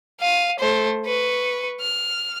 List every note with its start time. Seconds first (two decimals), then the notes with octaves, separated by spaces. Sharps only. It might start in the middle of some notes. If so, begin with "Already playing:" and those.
0.20 F5 D#7
0.59 A3 C5
1.05 B4 C#6
1.81 F6